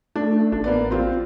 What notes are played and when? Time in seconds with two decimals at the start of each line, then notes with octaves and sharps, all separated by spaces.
0.16 A3 D4
0.52 A1 D4
0.64 A#3 B3 D5
0.91 C4 F4 G4